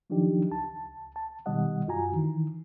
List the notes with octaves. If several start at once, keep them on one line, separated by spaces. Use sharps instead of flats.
D#3 F3 F#3 D4 D#4 G4
C#2 A5
A5
B2 D#3 G3 D#5 F#5
F#2 F4 F#4 G#5 A#5
D#3 E3